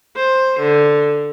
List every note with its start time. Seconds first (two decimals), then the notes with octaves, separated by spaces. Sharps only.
0.16 C5
0.61 D3